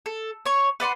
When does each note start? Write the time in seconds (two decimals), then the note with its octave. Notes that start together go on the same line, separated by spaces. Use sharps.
0.06 A4
0.46 C#5 C#6
0.80 B4 D5 F#5 C6